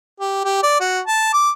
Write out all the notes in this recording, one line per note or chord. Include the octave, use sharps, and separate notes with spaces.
G4
G4
D5
F#4
A5
D6